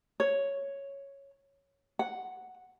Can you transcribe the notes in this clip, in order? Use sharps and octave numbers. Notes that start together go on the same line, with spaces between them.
C#5
F#5